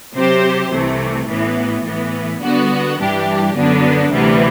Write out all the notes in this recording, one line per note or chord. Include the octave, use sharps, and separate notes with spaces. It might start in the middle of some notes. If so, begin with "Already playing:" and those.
C3 F#3 C4 G4 C5
C2 C3 E3 A3
A1 A2 E3 B3
A2 E3 B3
D3 G3 B3 F#4
G2 E3 G3 D4 G4
F#2 D3 F#3 B3 D4
D2 C3 E3 G3 B3